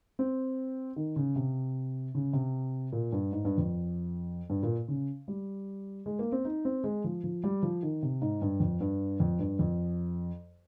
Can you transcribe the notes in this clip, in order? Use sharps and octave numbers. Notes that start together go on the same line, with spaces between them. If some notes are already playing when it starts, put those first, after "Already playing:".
C4
D#3
C#3
C3
C#3
C3
A#2
G2
G#2
G2
F2
G2
A#2
C#3
G3
G#3
A#3
C4
D#4
C4
G#3
F3
F3
G3
F3
D#3
C3
G#2
G2
F2
G2
F2
G2
F2